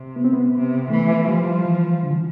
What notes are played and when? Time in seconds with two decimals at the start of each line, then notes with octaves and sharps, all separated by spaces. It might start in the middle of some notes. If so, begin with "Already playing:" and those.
Already playing: C3
0.16 B3
0.24 C4
0.33 B3
0.54 C3
0.90 E3 A3
1.28 F3 G3
1.65 E3
2.03 D3
2.11 E3